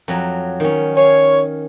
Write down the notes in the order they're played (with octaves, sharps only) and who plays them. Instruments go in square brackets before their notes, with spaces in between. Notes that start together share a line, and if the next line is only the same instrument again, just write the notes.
[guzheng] F2 F#3
D#3 C#4
[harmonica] C#5 [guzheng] F5 G#5